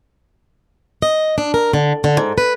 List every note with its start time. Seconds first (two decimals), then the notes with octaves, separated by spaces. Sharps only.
1.02 D#5
1.38 D4
1.54 A#4
1.74 D3
2.04 D3
2.17 G#2
2.38 B4